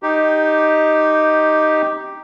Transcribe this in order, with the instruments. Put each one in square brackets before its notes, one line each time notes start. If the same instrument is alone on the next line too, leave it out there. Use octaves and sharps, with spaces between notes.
[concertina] D#4 G4